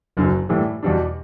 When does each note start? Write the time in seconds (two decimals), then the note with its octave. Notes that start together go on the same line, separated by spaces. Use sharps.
0.17 F#1 F#2 D3
0.49 A2 E3 G3
0.83 E2 B2 G3 D4